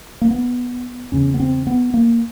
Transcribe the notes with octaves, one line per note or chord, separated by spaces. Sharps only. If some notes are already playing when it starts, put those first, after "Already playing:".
A#3
B3
E2 C#3 C#4
B3
C4
B3
A#3